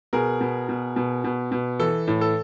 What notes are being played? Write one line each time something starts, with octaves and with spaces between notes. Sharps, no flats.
B2 G#4 A#4
B2
B2
B2
B2
B2
E3 A4
A2
A4